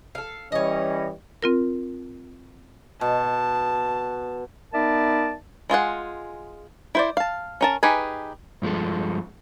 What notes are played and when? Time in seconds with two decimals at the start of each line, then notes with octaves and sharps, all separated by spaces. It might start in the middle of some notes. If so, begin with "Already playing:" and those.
0.15 A4 F5
0.52 E3 G3 C#4 C#5 D#5
1.42 C4 F4 A#4
3.01 B2 A5
4.74 B3 D#4 A#4 D5 E5 A5
5.70 G#3 F4 G#4 F#5
6.95 E4 C5 D5
7.17 F5 A5
7.61 C#4 A#4 A5
7.83 D#4 G4 G#4 B4 G#5
8.62 G2 F3 G#3 A4